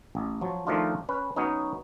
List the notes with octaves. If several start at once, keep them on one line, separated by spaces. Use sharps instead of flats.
A1
F3 F#3
D#3 F3 A3 D4 D#4 F4
C#4 B4
F#3 B3 C#4 D#4